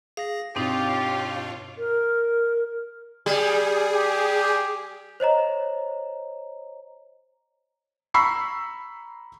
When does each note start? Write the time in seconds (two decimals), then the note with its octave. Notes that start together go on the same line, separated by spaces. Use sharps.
0.17 G#4 F5 A#6
0.56 G2 B2 C4 D#4 F4 G4 C#5
1.78 A#4
3.26 G3 G#4
3.93 G4
5.20 C5 C#5 D#5 A#5
8.14 A#5 B5 C#6 E6 B6 C7